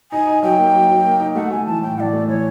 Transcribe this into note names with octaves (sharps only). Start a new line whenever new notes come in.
D#4 G#5
D#4
F#3 G5
A#3
F#3
F#3
A#3
D#4
A3 F#5
A3 G#5
E3 A5
A2 G5
E3 D5 F#5
A3
E3 C#5